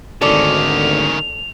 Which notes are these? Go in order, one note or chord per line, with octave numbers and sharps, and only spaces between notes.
G#1 D2 D3 D#3 C#4 A4 D5 F7